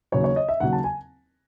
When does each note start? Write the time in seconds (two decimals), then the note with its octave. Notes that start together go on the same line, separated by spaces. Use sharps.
0.12 D#2 C#3 F#3 C#5
0.24 C#5
0.36 D#5
0.48 E5
0.60 D#2 C#3 F#3 F#5
0.73 A5
0.84 G#5